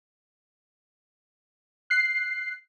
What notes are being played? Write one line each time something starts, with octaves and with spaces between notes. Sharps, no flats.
F#6 C7